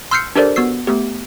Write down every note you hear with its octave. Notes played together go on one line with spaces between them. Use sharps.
C6 E6 F6 G6 C7 C#7
D4 G4 A4 A#4 C5 D5
B3 F#4 E6 C7
A3 B3 G4